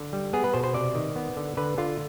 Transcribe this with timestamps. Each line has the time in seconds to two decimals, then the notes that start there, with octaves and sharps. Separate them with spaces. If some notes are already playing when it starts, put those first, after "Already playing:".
Already playing: D3
0.13 G3
0.33 B3 G#4
0.44 B4
0.54 B2 C5
0.64 C5
0.74 C3 D5
0.95 D#3
1.16 B3
1.37 D3
1.57 D3 B4
1.78 D3 F4